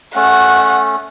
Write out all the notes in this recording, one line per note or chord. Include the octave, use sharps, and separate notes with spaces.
A3 C#4 F#5